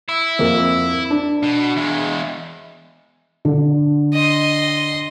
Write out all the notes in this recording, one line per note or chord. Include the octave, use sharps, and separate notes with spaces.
E4
F2 A#3 A#4
D4
B2
E2 G#3
D3
D#5 C6